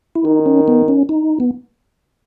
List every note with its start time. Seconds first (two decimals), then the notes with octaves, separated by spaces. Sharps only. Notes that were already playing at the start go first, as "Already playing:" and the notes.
0.15 E4
0.25 D#3 D#4
0.46 C#4
0.68 B3
0.88 C#4
1.09 D#4
1.40 B3